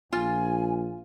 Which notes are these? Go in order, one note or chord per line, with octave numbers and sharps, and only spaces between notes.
A#1 F4 G#5